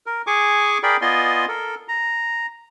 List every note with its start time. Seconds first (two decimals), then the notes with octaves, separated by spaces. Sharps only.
0.06 A#4
0.27 G#4 G#5 C#6 D6
0.83 G#4 A#4 D5 G5 B5
1.02 B3 F4 D5 D#5 G#5 C6
1.48 A4 A#4
1.88 A#5